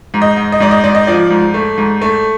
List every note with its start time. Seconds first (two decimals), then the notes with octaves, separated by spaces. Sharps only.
0.14 G#2
0.22 D#5
0.37 G#2
0.52 D#5
0.60 G#2 D5
0.71 D#5
0.84 G#2 D5
0.95 D#5
1.07 F3 D5
1.30 G#2
1.54 A3
1.78 G#2
2.01 A3